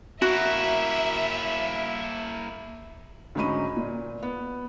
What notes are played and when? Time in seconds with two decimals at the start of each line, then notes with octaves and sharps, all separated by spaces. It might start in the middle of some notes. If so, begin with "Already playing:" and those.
0.22 A#3 E4 F#4 E5
3.35 D2 G#2 C#4 D#4 B5 D#7
3.77 A#2
4.23 B3